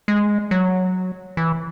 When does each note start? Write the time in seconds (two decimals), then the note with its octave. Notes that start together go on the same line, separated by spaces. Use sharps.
0.08 G#3
0.51 F#3
1.37 E3